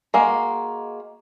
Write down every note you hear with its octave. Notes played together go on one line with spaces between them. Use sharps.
G#3 A#3 F#4